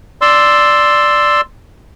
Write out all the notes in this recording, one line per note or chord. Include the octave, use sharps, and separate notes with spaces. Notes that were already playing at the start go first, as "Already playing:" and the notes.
D5 C6 E6